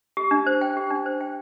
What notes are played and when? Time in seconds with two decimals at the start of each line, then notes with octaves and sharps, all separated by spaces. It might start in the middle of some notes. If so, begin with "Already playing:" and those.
0.17 G4
0.31 D4
0.46 C5
0.61 G5
0.77 G4
0.91 D4
1.06 C5
1.21 G5